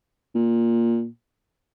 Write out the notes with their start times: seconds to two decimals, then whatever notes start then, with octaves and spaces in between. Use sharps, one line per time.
0.35 A#2